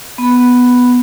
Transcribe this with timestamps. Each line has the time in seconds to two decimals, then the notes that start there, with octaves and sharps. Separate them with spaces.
0.18 B3 B5